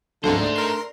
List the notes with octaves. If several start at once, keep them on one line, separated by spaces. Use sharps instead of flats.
D2 G#2 D3 F3 F#3 C4 D#4 C5
A3 D4
A#4 C6